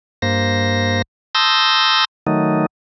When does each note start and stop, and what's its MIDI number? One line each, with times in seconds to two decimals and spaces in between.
0.22 1.02 43
0.22 1.02 58
0.22 1.02 72
0.22 1.02 94
1.35 2.05 81
1.35 2.05 84
1.35 2.05 87
1.35 2.05 88
1.35 2.05 91
1.35 2.05 94
2.27 2.66 51
2.27 2.66 54
2.27 2.66 57
2.27 2.66 63